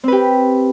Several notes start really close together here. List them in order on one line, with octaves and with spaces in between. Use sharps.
C4 B4 G4